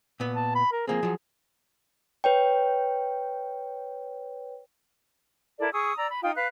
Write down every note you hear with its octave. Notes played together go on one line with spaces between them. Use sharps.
A#2 B3
A5
B5
A#4
F3 A#3 C4 G#4
F3 F#3
B4 C#5 G5
E4 A4 A#4 D5
G#4 C#6 D#6 E6
D5 A#5 E6
B5
D#4 F4 G5 D#6
B4 F5 F#6